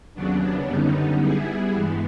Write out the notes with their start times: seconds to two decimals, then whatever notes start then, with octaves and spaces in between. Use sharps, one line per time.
0.15 D#2 C#3 F#3 B3 D4
0.67 F#2 D3 G3 B3 D#4
1.21 G3 B3 E4 G#4
1.74 G2 E3 G#3 B3